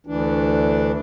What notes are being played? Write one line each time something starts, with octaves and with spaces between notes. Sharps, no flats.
D2 E3 D4